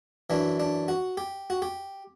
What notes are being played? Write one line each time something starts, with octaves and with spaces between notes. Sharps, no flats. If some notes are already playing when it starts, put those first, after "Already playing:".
F#2 E3 D4
D4
F#4
G4
F#4
G4